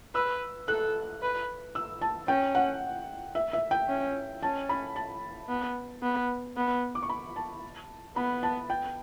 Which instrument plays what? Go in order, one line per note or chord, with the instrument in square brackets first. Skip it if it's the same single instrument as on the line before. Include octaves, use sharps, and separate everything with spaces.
[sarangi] B4 [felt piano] E6
[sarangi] A4 [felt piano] F#6
[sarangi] B4
[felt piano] E6
A5
[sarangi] C#4 [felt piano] G5
[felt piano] F#5
E5
E5
G5
[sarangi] C#4
[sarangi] C#4 [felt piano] A5
[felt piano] B5
A5
[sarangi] B3
B3
B3
[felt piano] D6
C#6
B5
A5
[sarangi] B3 [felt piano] B5
[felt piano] A5
G5